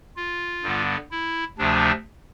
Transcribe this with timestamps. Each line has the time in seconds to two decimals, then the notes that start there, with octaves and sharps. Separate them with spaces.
0.16 F4
0.63 G2 D3 G3 B3
1.11 E4
1.58 D2 C3 F3 A3 D4